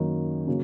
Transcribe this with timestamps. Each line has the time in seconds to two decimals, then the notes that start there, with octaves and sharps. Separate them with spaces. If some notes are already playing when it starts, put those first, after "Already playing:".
Already playing: F#2 D#3 F#3 A#3
0.47 C#3 F#3 A#3